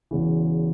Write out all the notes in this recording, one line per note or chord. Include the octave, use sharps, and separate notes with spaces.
E1 E2 C#3 E3